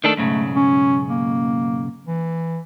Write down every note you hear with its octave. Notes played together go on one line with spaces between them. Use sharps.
D#3 A3 D4 A4
B1 G#2 C#3 A3
C#4
A#3
E3